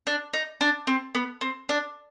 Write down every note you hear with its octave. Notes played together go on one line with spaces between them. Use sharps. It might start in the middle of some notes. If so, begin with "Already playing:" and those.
D4
D#4
D4
C4
B3
C4
D4